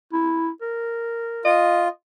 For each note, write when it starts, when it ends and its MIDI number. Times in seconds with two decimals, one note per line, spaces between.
0.13 0.50 64
0.62 1.49 70
1.45 1.88 65
1.45 1.88 75